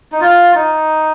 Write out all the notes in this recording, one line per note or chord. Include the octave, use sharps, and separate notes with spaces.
D#4
F4
D#4